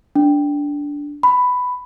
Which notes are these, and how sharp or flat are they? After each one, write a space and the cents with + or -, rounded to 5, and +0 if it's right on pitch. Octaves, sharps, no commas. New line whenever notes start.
D4 -15
B5 +10